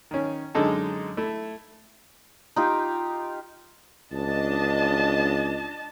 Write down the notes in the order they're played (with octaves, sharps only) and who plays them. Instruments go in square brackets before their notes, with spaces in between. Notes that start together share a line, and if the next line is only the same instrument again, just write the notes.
[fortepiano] D#3 C#4
F#2 D3 G#3 D#4 A4 A5
A3 E4
[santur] D#4 F4 G4
[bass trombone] C#2 [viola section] D4 D#5 A5